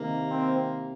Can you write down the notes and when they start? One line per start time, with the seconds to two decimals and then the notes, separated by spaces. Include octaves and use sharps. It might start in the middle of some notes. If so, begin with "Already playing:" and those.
Already playing: C3 D#3 A#3
0.29 C4